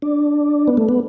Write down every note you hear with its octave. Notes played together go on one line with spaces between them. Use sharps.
D4
B3
A3
B3